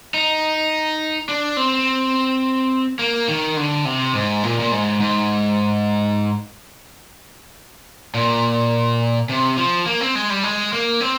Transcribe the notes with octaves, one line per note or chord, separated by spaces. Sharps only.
D#4
D4
C4
A#3
D#3
D3
C3
G#2
A#2
A#2
G#2
G#2
A#2
C3
F3
A#3
C4
G#3
G3
G#3
A#3
C4